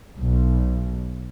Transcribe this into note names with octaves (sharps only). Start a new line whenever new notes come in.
B1